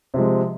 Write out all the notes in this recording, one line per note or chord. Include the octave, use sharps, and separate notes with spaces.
C3 F3 G#3